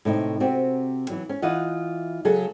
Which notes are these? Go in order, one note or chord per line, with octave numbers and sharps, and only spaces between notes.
A2 C3 D#4
C3 C4 F#4
E3 F#3
C#4
E3 F4 D#5 F#5
C#3 F#3 G#4 A4